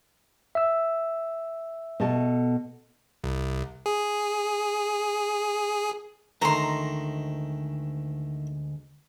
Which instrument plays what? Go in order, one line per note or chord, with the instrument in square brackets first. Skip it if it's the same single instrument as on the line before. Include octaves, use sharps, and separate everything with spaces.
[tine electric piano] E5 E6
[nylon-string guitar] B2 A4
[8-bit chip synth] C2
G#4
[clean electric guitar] D2 D3 G#3 [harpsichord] D#3 A3 [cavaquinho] A#5 C6